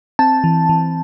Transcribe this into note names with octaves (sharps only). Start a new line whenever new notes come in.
C4 A5
E3
E3